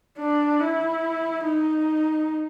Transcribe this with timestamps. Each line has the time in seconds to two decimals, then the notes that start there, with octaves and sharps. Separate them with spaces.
0.18 D4
0.61 E4
1.46 D#4